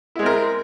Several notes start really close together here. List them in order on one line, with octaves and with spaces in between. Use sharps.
E4 G#3 C4 A#4